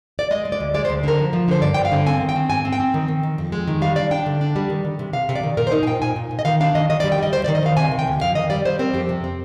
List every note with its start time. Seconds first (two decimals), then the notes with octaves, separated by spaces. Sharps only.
0.19 D5
0.31 G#3 D#5
0.45 G#3
0.52 D5
0.60 D2
0.74 G#3 D5
0.85 C5
0.90 D2
1.03 D3 A#4
1.19 F3
1.33 F3
1.48 D3 C5
1.62 G2 D5
1.74 G2 G5
1.85 F5
1.92 D3
2.06 C4 G#5
2.21 D#3
2.29 G5
2.36 C4
2.50 G#2 G#5
2.65 C4
2.73 G5
2.80 C4
2.94 D#3
3.08 D#3
3.23 D#3
3.38 F2
3.52 G#3
3.68 D#3
3.82 G3 F5
3.96 D4 D5
4.11 D4 G5
4.26 D3
4.41 D4
4.56 G3
4.70 D#3
4.85 D#3
4.99 C3
5.13 C3 F5
5.29 C3
5.35 D5
5.43 D#3
5.57 A#2 A#4
5.67 C5
5.72 D#4 A#4
5.83 G#5
5.87 A#2 G5
6.02 A#2 G#5
6.16 A#2
6.31 A#2
6.39 D#5
6.45 D#3 F5
6.60 D4 F5
6.75 D#3 D#5
6.90 D#3 D#5
7.00 D5
7.04 G3
7.12 G5
7.18 G3 D#5
7.33 D2 C5
7.44 D5
7.48 D#3
7.55 D#5
7.63 D#3 F5
7.77 C3 G#5
7.92 D#3
7.99 G5
8.07 D2
8.21 F2 F5
8.35 D#3 D#5
8.50 G3 D5
8.65 G3 C5
8.79 C4 A#4
8.94 F2 G4
9.09 C3
9.24 C4